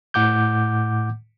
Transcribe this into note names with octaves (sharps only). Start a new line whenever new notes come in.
A2 F#5 D6 G6